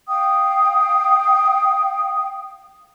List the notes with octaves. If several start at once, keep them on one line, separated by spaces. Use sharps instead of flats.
F5 G5 D#6